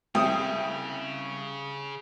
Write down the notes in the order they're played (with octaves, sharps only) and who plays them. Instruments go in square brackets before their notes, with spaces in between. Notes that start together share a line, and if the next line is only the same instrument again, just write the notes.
[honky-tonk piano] C2 [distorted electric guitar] C#3 [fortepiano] G5 D#6